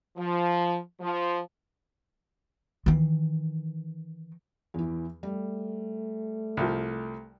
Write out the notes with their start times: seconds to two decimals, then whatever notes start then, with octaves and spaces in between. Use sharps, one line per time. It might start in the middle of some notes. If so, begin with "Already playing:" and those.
0.17 F3
1.00 F3
2.86 D#3 E3
4.74 E2 E3
5.23 G3 A3
6.57 C2 F3